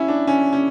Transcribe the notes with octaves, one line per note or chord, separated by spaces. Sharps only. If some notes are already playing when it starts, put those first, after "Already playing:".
Already playing: C#4 E4
D4
C#4
C#4